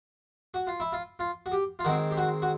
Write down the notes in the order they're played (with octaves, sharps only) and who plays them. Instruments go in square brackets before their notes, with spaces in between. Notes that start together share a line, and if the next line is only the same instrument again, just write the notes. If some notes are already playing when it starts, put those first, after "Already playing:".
[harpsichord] F#4
F4
E4
F4
F4
F#4
G4
F4
D#3 G#3 C4 F#4
G4
F#4
F#4